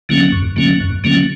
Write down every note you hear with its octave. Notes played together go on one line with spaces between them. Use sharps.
D3 F#3 A#3 C#4
F#2
D3 F#3 A#3 C#4
F#2
D3 F#3 A#3 C#4